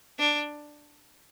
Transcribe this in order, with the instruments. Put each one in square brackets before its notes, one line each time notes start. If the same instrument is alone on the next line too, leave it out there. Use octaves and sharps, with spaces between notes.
[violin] D4